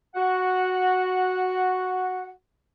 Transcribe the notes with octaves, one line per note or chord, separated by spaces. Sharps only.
F#4 F#5